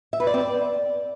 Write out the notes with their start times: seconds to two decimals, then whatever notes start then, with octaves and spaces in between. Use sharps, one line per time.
0.13 E5
0.20 B4
0.27 D5
0.34 C4
0.41 D5